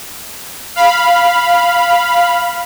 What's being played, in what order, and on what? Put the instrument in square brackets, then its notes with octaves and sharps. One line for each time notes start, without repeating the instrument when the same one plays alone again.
[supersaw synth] F5 B5